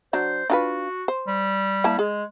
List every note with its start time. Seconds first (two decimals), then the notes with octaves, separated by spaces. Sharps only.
0.13 F#3 D4 C5
0.50 D4 F4 F#4 B4
1.08 C5
1.27 G3
1.84 A#3 E4 A5
1.99 G#3 G#4